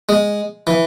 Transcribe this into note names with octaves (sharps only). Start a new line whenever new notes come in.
G#3
E3